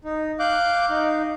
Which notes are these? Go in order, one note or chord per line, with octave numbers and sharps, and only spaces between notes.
D#4
F5 D6 F#6 G6
D#4